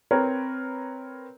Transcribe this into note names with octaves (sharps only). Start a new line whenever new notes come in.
C4 A#4 B4 C#5